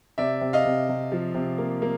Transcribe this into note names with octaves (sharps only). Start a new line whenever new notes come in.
C3 D5 E5
C3
D#5 F5
C3
C3
F3
C3
A#3
A#3